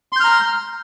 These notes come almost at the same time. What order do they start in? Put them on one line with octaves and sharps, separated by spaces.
C6 G6 F6 A#5